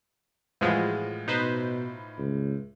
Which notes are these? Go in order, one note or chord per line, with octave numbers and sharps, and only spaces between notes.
A2 E3 F3 G#3 F4 F#4
B2 D#4 B4 C5
C#2